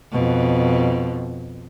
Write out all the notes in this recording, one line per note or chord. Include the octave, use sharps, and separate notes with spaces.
F2 B2